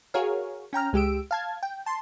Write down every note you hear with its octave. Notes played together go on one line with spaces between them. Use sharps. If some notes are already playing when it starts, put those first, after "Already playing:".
F#4 G#4 A#4 C#5 F5
C#4 G5 A#5 F6
C#2 G#3 G4 E6 D7
F5 A5 G#6
G5
A5 C6